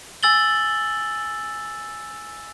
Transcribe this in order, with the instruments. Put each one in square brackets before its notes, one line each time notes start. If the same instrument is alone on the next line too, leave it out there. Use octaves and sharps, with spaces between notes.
[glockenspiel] G#5 E6 A6 F#7 G7